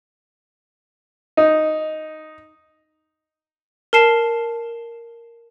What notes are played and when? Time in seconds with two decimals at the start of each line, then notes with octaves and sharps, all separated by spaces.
1.37 D#4
3.93 A#4 A5 C7 E7